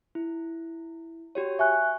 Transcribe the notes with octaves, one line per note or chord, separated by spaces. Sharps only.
E4
F#4 G4 C#5
E5 G#5 C#6 F#6